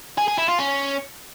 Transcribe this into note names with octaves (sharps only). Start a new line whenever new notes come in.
G#4
G#4
E4
F4
C#4